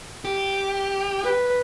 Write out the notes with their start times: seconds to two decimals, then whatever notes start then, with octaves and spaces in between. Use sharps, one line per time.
0.25 G4
1.24 B4